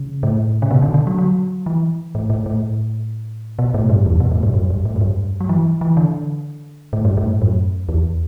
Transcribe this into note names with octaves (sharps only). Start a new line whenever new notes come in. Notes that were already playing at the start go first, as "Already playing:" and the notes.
Already playing: C#3
A2
C#3
B2
D3
D3
F#3
F#3
E3
A2
A2
A2
B2
A2
G2
E2
B2
A2
G2
F#2
G2
A2
F#2
G2
F#3
E3
E3
D3
A2
G2
A2
F#2
E2